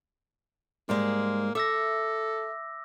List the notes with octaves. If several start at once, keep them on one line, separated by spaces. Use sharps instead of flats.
G#2 G3 G#3 A#3
A4 E5 D6 E6 A#6